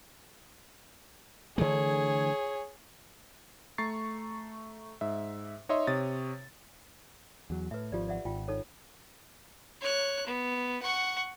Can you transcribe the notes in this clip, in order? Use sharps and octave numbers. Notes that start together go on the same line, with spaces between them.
D3 E3 A3 G#4 C#5
A3 A#5 C#6 A6 C7
G#2 E5
D#4 C#5 D#5 E5 C6
C3 C#5 D#6 A6
E2 F#3
A2 B4 E5
G#1 F3 F4 G4 D5
D5 E5 F#5
G#1 F4 G5
D#4 A4 C#5
C#5 F#6
B3
F#5 C#6